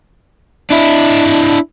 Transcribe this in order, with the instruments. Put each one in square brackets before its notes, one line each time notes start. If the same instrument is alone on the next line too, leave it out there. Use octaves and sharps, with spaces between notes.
[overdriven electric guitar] D4 E4